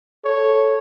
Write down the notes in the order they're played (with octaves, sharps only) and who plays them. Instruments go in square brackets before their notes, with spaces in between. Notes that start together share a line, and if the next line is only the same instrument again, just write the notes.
[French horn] A4 [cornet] C#5